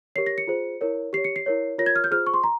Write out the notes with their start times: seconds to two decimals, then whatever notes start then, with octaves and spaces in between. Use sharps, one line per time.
0.16 G4 A#4 C#5 C7
0.27 A#6
0.38 C#7
0.47 F4 G#4 C5
0.81 E4 A#4 C#5
1.13 G4 C7
1.17 C#5
1.24 C#7
1.36 C7
1.46 E4 A#4 C#5
1.78 F4 A#4 C#5 A#6
1.86 G#6
1.96 F6
2.04 G6
2.11 F4 G#4 C5 F6
2.27 C#6
2.34 C6
2.44 A#5